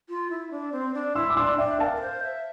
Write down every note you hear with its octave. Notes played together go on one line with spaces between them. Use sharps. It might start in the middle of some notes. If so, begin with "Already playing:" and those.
F4
E4
D4
C4
D4
E4 C6 E6
D6
D4 C6 E6
D4 E5 G5
A#4 F5 A5
A#4
C5
E5